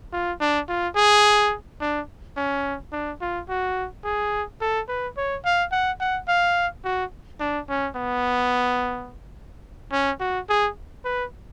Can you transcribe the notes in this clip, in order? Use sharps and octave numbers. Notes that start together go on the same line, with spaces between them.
F4
D4
F4
G#4
D4
C#4
D4
F4
F#4
G#4
A4
B4
C#5
F5
F#5
F#5
F5
F#4
D4
C#4
B3
C#4
F#4
G#4
B4